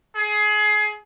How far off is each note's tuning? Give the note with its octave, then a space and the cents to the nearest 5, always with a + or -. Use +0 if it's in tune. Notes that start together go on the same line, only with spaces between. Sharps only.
G#4 +25